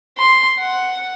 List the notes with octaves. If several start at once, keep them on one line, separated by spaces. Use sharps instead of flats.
C6
F#5